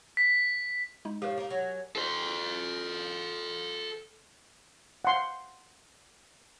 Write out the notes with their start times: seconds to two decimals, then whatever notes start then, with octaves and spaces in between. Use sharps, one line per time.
0.17 B6
1.05 G#3 D#4
1.22 A2 F3 G4 A#4
1.38 A#3 D#4
1.50 F#3 G#5
1.96 A4 C5
5.05 F#5 C6